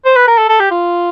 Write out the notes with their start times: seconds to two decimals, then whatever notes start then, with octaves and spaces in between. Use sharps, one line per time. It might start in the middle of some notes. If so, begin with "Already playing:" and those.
0.05 C5
0.16 B4
0.28 A#4
0.38 A4
0.49 A4
0.60 G4
0.71 F4